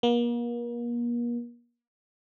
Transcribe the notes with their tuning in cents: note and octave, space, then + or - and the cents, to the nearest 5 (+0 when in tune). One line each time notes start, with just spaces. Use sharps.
A#3 +40